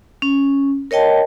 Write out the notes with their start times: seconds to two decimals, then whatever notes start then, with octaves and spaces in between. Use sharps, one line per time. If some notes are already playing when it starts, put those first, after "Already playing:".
0.22 C#4
0.91 A#4 C#5 D#5 G5 A5